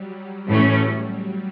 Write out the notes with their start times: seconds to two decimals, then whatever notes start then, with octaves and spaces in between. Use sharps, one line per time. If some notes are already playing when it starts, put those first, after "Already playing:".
Already playing: F#3 G3
0.47 A2 E3 A3 C#4